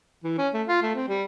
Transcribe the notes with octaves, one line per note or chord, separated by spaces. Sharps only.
E3
C#4
A3
F4
A3
C4
G3